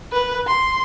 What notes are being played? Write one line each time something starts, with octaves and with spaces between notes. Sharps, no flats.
B4
C6